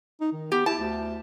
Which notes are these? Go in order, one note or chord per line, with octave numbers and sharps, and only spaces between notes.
D#4
D#3
B3 G4
E4 A5
D2